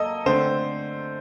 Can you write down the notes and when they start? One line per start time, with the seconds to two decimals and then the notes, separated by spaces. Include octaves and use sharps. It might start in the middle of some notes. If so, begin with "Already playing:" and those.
Already playing: F#3 A#3 A4 D#5
0.26 D3 A3 C4 C5